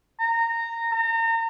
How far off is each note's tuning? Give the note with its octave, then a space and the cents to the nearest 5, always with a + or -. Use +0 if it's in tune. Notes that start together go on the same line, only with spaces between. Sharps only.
A#5 -15
A#5 -35